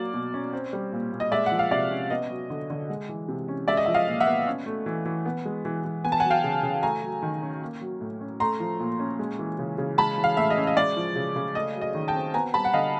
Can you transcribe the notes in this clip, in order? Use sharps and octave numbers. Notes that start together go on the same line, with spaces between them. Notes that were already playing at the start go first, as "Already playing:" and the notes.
Already playing: F#3 A#3 D5
B2
C#4
C4
G3
A#2
A#2
D#5
G#3 D5 E5
F#5
F3
F5
C3 D5 E5
C#4
B3 D#5
F#3
D3
D3
G#3
E3
C3
C#4
G#3 D5 E5
D#5
F3 E5
D#5 F5
A#2
E5 F#5
B3
C#4
A3
E3
E3
B3
G#3
E3
E3
B3 G#5
A5
F#5 G#5
F#3
F5 G5
C#3
C#3
A3 G#5 A#5
F#3
D#3
C#4
A#3
F#3
A2
C#4
A3 A#5 C6
F3
A#2
C#4
G#3
E3
C#3
C#3
G#3 A5 B5
E3
F5
A2 E5
D#5
C#4
D#5
G#3 D5
F3
C#3
C#3
A3 D#5
F#3
D#5
D#3
G5 A5
C4
B3 G#5 A#5
G3 A5 B5
F#5
D3 D#5 F5